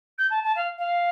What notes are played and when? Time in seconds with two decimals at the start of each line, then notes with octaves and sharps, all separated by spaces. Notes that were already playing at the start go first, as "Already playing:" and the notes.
0.18 G6
0.30 A5
0.43 A5
0.55 F5
0.78 F5